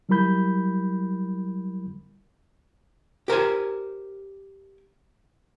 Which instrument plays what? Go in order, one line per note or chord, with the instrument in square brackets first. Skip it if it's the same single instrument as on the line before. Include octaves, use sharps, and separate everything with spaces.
[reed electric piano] F#3 G3 E4 A#4 B5 G6
[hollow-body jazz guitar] G4 A#4 C5 G#5